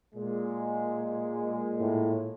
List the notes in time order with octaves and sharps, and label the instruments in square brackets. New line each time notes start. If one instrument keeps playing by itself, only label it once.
[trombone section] A#2 G#3
[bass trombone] A2